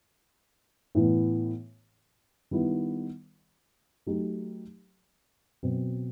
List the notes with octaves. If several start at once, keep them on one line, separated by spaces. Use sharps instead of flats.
A2 E3 B3
D#3 G3 B3 E4
F#3 A3 D#4 G4
B2 F#3 C4